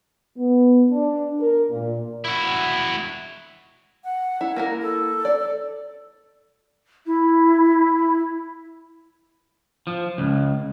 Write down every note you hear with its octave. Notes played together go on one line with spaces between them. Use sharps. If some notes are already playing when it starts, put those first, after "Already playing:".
B3
D4
A#4
A#2
E4 F#4
F#5
E4
A#3 E4 A#4
A4
D5
E4
F3
C#2